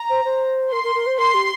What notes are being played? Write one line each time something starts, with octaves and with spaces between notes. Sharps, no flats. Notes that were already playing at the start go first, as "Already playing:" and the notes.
Already playing: A#5
C5
C5
A#4 C6
A#4
A#4
C5
A#4 C6
G4